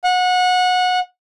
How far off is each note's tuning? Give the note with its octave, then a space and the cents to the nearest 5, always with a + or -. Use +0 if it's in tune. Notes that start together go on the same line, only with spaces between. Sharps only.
F#5 -25